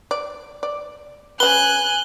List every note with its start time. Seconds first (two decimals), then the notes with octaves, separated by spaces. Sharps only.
0.11 D5
0.63 D5
1.40 C#3 B4 G#5 F#6 G7